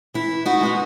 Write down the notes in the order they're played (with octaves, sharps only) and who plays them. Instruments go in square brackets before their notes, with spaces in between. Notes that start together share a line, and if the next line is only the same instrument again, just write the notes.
[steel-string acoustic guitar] E3 E4
D#4 F#4
G#3 B3 D#4